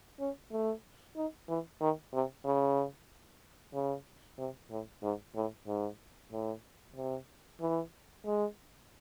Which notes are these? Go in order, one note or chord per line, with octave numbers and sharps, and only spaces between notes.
C#4
A3
D#4
E3
D#3
C3
C#3
C#3
C3
A2
G#2
A2
G#2
A2
C3
E3
G#3